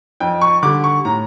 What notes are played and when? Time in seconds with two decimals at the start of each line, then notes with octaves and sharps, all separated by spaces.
0.20 F2 G5
0.42 C#6
0.62 D3 G3 D6
0.84 C#6
1.05 A2 A#5